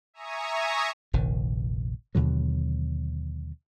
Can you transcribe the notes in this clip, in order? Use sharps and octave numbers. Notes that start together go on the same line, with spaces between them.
E5 G#5 A#5 C#6 D#6
F1 A#1 D#3
D#2 B2 D3 F#3